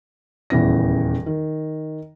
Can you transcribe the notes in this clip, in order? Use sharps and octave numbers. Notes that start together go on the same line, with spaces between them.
D#1 E2 C#3 E3 A#6
D#3